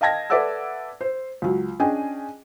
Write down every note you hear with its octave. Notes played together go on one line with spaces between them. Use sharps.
D#5 F5 G5 A5 G#6 A#6
A4 B4 D5 E5 F#5 E6
C5
C#2 F#3
C#4 D4 G#4 D#5 G5 G#5